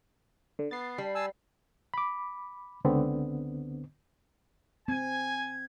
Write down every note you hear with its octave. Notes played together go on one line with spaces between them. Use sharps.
D3
B3 A6 C7
G3 C7
G#5 A5 E6
B5 D6
C#2 D3 B3 C4
C4 G#5 G#6